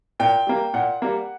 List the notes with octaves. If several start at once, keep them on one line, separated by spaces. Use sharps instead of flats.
A#2 G5
G3 A#3
A#2 F#5
G3 A#3